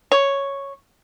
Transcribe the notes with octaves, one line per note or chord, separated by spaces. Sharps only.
C#5